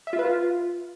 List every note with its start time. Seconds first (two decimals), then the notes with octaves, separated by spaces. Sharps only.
0.07 E5
0.13 F4
0.19 B4
0.25 F4